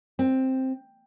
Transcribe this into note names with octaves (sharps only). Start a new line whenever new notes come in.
C4